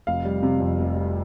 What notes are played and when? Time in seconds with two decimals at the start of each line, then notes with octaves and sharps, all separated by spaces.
0.07 F1 F5
0.25 G3
0.43 C3
0.60 F2
0.79 F1
0.96 G3